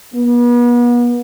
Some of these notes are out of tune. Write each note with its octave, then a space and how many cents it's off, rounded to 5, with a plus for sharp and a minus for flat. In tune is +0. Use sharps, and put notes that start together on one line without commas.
B3 -40